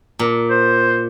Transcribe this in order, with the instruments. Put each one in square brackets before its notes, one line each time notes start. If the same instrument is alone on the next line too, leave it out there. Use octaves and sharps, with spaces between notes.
[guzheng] A#2
[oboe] C5